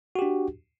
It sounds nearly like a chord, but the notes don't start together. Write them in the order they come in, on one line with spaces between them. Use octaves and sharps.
F#4 G4 D4